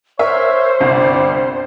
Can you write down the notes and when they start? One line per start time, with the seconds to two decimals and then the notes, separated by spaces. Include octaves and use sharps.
0.19 A#4 C5 C#5 E5
0.81 G1 C2 G3